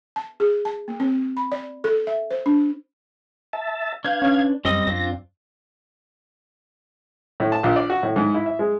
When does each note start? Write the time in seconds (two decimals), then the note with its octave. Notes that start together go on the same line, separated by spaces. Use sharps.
0.16 A5
0.40 G#4
0.65 A5
0.88 A#3
1.00 C4
1.37 B5
1.52 D5
1.84 A4
2.07 E5
2.31 C5
2.46 D4
3.53 E5 A5
4.04 D4 B4 F5 G6 G#6
4.22 C#4
4.65 F#2 G3 C4 D#5 A#6
4.87 F#2 C4 D4 F4
7.40 A2
7.52 A5
7.63 A#1
7.76 D5
7.90 F#4
8.03 A2
8.16 G#2
8.35 E4
8.46 E5
8.59 G#3